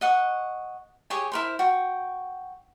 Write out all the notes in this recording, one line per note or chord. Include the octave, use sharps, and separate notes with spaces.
D#5 F#5 C#6
G4 G#4 C#5 G#5
E4 A#4 C5
F#4 G5